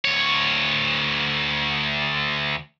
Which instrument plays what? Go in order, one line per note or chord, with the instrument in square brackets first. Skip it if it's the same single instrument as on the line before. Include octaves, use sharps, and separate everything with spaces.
[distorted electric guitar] D2 C#5